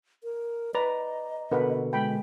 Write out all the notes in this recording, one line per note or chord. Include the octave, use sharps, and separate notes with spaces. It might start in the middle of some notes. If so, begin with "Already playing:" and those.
A#4
B4 D5 D#5 A#5
B2 D3 A#4 B4 F#5
G#3 G5 B5